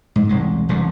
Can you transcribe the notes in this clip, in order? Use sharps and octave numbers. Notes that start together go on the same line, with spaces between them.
G#2
E1 C2 G#3
E1 C2 D3